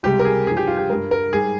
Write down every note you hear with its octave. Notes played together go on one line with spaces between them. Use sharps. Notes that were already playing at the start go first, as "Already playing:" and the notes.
C#2 C3 G3 G4
A#4
G#4
G2 F3 G#4
G4
F4
G4
G2 G3 A#4
A#4
G#2 G3 G#4